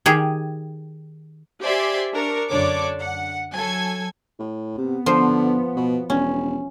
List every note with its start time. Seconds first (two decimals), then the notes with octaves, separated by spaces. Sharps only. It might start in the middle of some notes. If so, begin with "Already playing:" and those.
0.06 D#3 G4 G#4
1.62 G4 C5 D5 E5 G#5 C6
2.13 D4 A#4 C#6
2.50 F#2 D3 D4 C#5 D5 D6
3.01 F#5
3.52 F#3 A4 G#5 G#6
4.39 A2
4.78 C3 B3
5.06 D3 F3 C5
5.77 B2
6.10 E1 C#4